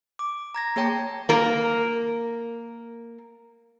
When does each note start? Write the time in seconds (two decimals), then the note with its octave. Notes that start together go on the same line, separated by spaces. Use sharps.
0.19 D6
0.55 A#5 G#6 A#6
0.76 A#3 G#4 C#5 G5 A5 A#6
1.29 A#3 A#4